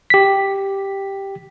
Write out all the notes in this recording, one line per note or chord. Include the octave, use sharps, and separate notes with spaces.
G4 B6